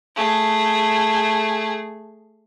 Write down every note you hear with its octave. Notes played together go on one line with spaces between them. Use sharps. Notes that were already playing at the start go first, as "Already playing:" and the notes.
A3 G#4